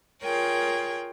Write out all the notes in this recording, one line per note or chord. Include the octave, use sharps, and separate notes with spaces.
F4 G#4 A#4 C#5 G5